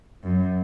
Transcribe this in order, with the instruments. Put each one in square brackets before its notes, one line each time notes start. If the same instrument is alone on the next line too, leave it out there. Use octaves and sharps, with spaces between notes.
[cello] F#2